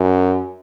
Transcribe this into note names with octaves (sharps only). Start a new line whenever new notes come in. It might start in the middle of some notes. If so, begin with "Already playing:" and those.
Already playing: F#2